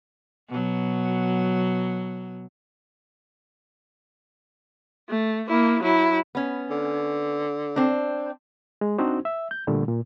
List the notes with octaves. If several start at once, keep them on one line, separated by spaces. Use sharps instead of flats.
B2 F#3
A3
A#3 E4
F#3 E4
B3 C#4
D3
C4 D4
G#3
C4 D4 D#4 F#4 C5
E5
G6
A#2 D3 G3 A3
A#2